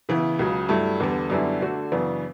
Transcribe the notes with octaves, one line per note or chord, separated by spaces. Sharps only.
C#3 E3 B3 E4
C#2 C#3 F#3
G2 F#3 A3 E4
E2 D3 G3 B3
F#2 D3 G3 B3 E4
D3 A3 D4 F#4
F#2 C#3 E3 B3 D4